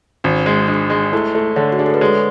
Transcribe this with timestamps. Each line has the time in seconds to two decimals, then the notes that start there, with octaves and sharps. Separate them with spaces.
0.24 G#1 C#4
0.46 G#3
0.68 G#3 D4
0.90 G#3
1.13 A3 E4
1.35 A3
1.56 D3 C#5
1.72 F#4
1.79 D4 G#4
1.86 A4
1.94 B4
2.01 G#3 C#5